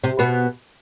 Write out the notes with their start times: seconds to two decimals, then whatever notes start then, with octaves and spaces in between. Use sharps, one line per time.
0.03 C3 C4
0.19 B2 B3